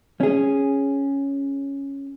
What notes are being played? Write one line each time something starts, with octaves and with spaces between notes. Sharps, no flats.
C#4 G#4